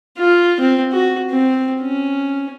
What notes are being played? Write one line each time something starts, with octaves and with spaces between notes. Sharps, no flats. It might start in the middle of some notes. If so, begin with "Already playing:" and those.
F4
C4
F#4
C4
C#4